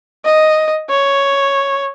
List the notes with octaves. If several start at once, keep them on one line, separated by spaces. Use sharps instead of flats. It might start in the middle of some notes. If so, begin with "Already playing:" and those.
D#5
C#5